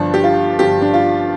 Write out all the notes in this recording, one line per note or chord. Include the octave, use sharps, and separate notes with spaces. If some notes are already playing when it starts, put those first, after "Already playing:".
Already playing: G1 G2 F3 D4
G4
F4
G1 G2 F3 G4
D4
F4